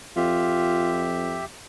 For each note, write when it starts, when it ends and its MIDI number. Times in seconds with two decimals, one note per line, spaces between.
0.17 1.44 41
0.17 1.15 65
0.17 1.45 67
0.17 1.45 76